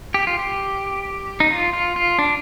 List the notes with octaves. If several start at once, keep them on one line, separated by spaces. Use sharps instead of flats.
G4
F4
G4
D#4
F4
F4
F4
D4